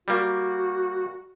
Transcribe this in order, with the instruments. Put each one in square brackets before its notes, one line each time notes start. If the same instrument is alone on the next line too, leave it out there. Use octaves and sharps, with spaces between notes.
[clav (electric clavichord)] G3 A#3 [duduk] F#4